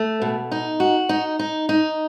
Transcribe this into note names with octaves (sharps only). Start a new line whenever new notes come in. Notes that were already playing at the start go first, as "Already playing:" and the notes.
Already playing: A3
B2
D#4
F#4
D#4
D#4
D#4